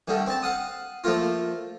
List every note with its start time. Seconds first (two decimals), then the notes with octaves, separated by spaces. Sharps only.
0.08 D3 D#3 G3 A3
0.26 C4 A5
0.43 F5 F#5 D#6
1.04 F3 A3 A#3 F4